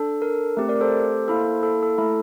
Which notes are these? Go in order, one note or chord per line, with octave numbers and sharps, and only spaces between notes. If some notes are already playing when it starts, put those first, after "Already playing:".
Already playing: D4 A4
A#4
A3 C4 G4
A#4 D5
A4 C5
A#3 E4 A4
A4
A4
A3 E4 A4